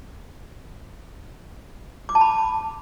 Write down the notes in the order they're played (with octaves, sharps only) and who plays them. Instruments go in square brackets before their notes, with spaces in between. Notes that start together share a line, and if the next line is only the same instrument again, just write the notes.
[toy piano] D6
A5
B5